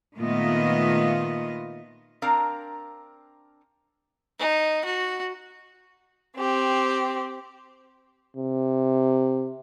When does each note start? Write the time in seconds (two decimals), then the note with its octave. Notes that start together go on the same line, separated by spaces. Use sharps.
0.17 A#2 D#3 A3 B3 F4 D#5
2.22 C4 D4 A#4 F5 A5 A#5
4.39 D#4
4.85 F#4
6.37 C4 G4
8.36 C3